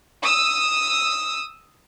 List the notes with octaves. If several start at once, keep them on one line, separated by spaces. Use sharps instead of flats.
D#6 E6